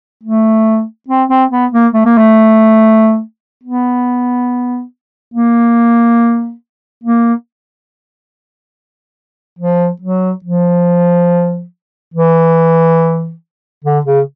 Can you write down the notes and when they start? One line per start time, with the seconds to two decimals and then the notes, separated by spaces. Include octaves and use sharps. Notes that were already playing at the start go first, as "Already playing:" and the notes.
0.23 A3
1.08 C4
1.29 C4
1.51 B3
1.72 A#3
1.93 A3
2.05 A#3
2.18 A3
3.64 B3
5.34 A#3
7.04 A#3
9.59 F3
10.02 F#3
10.44 F3
12.14 E3
13.84 D3
14.05 C#3